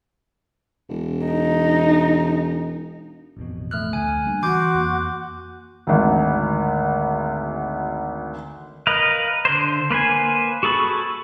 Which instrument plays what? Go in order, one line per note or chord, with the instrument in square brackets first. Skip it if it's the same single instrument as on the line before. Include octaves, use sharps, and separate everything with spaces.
[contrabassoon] E1
[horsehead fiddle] D#4
[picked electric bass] A1 F2 B2
[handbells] A3 F6 F#6
[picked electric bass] D2 [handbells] G#5
[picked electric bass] G3 A#3 D4
[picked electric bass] E3 [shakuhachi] F#4 [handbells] C6 D6 G6
[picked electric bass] F2 A#3
[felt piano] G#1 D2
[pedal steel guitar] A#4 B4 D#5 F5
D3 C5
A#3 B4 C5 G#5
F#4 G#4 A4 B5 C#6